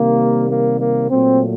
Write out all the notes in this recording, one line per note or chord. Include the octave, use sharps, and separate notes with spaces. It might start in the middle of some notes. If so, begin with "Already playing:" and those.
Already playing: C3 D#3 G3 A#3
A#3
A#3
A#2 F#3 A3 C4